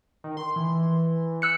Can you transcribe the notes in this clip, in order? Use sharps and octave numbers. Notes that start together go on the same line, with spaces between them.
D#3
C6
E3
E6 F#6 C#7